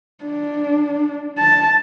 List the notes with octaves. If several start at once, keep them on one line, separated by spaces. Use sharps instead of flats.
D4
A5